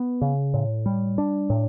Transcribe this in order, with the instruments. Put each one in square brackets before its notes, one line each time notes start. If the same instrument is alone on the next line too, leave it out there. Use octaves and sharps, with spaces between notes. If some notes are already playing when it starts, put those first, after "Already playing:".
Already playing: [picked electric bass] B3
C#3
A2
G3
D4
A2